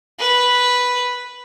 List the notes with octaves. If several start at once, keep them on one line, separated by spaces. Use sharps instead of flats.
B4